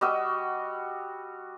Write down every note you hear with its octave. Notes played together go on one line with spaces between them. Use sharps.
G3 F#4 D#5 E6